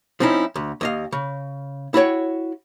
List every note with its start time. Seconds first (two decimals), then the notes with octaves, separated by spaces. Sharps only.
0.20 F3 C4 C#4 D#4 E4
0.56 D2
0.81 D#2 D#5 F5
1.12 C#3
1.94 E4 F#4 C#5 G5